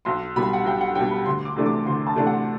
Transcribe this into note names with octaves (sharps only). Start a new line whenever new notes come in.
B1 C6
B2 G3 B5
F#5
B1 G5
F#5
B2 G3 G5
B5
D2 C6
D6
C3 E3 A3 D4
D6
D2 C6
A5
C3 E3 A3 D4
F#5